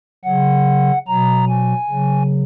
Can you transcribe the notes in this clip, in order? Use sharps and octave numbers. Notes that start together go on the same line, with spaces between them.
C#3 F#3 F#5
B2 F#3 A#5
G#5
C#3 F#3